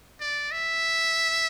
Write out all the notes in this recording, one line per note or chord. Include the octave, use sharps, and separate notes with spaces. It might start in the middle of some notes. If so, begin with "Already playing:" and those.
D5
E5